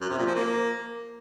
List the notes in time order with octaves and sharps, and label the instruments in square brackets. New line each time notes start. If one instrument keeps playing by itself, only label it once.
[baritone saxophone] F#2
C3
A#2
F3
A#3